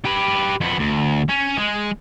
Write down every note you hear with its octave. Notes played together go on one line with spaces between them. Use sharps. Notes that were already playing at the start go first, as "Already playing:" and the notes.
G4 B4
F2 B3
D2
C#4
G#3